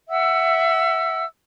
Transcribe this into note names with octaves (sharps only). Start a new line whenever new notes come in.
E5 F#5 E6